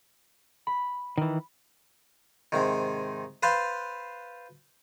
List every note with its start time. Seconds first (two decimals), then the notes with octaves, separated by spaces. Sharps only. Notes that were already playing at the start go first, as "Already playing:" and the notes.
0.67 B5
1.18 D#3 E3
2.52 G#2 C3 D#3
3.43 B4 C5 F5 A5 C6